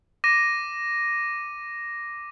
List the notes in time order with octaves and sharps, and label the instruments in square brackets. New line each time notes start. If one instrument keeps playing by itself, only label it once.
[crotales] D6 A#6 D#7